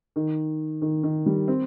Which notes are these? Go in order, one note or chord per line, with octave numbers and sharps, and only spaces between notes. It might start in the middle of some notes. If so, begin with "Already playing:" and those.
D#3
D#3
D#3
G3
C4